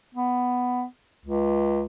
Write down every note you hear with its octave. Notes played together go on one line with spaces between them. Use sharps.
B3
C#2